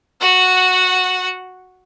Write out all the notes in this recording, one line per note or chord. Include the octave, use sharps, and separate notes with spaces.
F#4 F#5